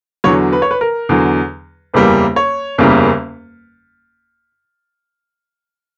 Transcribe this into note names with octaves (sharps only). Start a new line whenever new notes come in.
E2 D3 F#3 C#5
B4
C#5
B4
A#4
E2 D3 F#3
F#1 E2 C#3 G3 A#3 B4
C#5
F#1 E2 C#3 G3 A#3